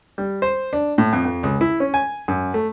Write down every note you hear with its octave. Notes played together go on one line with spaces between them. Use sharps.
G3
C5
D4
A2
F2
F2
C#2
E4
C#4
G#5
F#2
A3